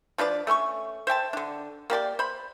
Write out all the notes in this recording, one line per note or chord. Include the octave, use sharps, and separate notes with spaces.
F3 D4 B4 D5
A3 C#4 C6 C#6
C5 E5 G5 A5
D3 D4
A#3 G4 D5 G5
C5 B5